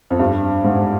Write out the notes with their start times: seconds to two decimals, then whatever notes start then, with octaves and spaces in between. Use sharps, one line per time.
0.10 F2
0.19 G2
0.64 G#2